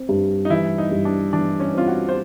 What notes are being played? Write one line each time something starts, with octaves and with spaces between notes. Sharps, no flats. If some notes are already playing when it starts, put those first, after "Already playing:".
Already playing: C4
G2
D#4
E3 E4
D#4
G2
D4
E3 D4
C#4
C4 F4
F#4
C5